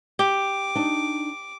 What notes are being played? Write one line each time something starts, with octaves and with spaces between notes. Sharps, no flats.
G4 D6
D4 D#4